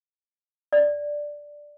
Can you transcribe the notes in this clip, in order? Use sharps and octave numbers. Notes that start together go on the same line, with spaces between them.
D5